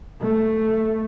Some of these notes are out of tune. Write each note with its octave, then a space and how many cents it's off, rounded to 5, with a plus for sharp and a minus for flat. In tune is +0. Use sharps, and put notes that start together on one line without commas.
A3 +5